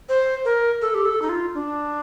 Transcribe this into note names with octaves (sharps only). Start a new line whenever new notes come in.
C5
A#4
A4
G4
A4
D#4
F4
D4